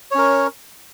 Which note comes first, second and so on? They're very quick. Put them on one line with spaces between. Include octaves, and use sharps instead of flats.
C#5 C#4 A#4